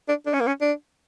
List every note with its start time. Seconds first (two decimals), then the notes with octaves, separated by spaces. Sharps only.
0.08 D4
0.26 D4
0.33 C#4
0.40 A#3
0.47 C#4
0.61 D4